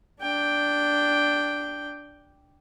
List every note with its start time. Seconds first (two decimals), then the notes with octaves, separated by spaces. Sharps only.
0.21 D4 G5